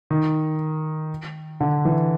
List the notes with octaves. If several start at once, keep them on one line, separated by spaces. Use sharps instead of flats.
D#3
D3
E3